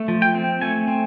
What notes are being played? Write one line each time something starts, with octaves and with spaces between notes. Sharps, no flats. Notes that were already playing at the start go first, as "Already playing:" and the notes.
Already playing: A3
F3
G5
C4
A3 G#5
C4